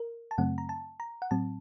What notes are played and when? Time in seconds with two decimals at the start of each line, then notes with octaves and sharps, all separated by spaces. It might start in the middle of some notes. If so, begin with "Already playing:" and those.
Already playing: A#4
0.31 A5
0.38 F#2 C#3 F#3 A3 C4 F#5
0.58 A#5
0.69 A5
1.00 A#5
1.22 F#5
1.31 A2 F#3 C4 A5